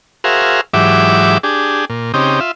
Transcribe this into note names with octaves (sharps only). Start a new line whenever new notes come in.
F#4 G#4 A#4 C5 E5 F5
G#2 E3 F#3 G4 E5 D6
D4 G4 G#4
A#2
C#3 C4 D#4 G4
F4 E5